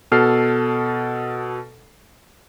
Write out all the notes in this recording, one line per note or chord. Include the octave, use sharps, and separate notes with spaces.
B2 A4 F6 C7